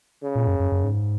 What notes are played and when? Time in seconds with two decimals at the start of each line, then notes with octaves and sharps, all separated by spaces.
0.22 C#3
0.35 A#2
0.47 F#2
0.60 F#2
0.72 F#2
0.84 G#2